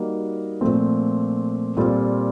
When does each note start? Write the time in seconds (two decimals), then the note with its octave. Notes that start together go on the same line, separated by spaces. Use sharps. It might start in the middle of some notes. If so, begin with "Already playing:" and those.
Already playing: G3 A#3 D#4 F#4
0.61 A#2 F3 A3 C4
1.77 A#2 G3 C4 F4 A4